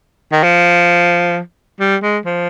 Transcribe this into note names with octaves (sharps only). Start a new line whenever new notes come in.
D#3
F3
G3
G#3
F3